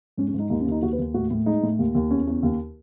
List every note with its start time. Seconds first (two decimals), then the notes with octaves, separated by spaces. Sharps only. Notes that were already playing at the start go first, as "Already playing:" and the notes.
0.17 G#2 C#4
0.28 C#4
0.34 G#2
0.39 D#4
0.50 D#2 D#4
0.61 C#4
0.66 D#2 D#4
0.82 D#2 F#4
0.93 B4
0.99 D#2
1.14 A2 F#4
1.31 A2
1.46 G#3 D#4
1.63 A2
1.79 D#2
1.95 D#2
2.11 E2 C#4
2.27 E2
2.43 D#2